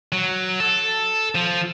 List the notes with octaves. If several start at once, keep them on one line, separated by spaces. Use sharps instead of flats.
F#3
A4
F3